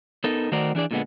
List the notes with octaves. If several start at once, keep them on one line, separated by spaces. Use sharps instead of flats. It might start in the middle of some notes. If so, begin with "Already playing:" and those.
B3 D#4 A4 A#4
D#3 A3 F#4 A#4 C5 D5
E3 D4 G#4 D5
A#2 D3 G#3 B3